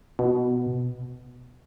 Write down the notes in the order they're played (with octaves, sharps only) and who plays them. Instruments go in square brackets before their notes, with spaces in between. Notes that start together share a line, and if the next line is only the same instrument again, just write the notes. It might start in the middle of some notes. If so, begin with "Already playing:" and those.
[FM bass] B2